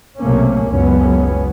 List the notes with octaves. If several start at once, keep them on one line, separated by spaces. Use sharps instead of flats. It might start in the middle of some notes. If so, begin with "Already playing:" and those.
B1 C3 A3 A#3 C#4
F#1 C#2 F#2 B3 C#4